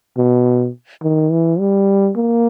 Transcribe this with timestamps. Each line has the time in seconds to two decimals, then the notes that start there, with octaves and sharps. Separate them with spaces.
0.17 B2
1.03 D#3
1.31 E3
1.59 G3
2.16 A#3